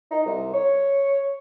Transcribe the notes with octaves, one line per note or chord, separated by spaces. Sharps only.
D#4
C2
C#5